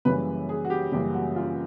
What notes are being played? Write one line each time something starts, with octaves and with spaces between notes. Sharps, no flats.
F#2 C#3 E3 G3 A#3 B4
G#4
F#4
G4
F#2 C#3 E3 G3 A#3 G4
F#4
F4